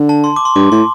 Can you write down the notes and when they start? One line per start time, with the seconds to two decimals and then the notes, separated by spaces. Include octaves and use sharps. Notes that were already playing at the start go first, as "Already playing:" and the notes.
Already playing: D3
0.09 A5
0.24 C6
0.36 D6
0.45 C6
0.56 G2 D6
0.71 A2 C6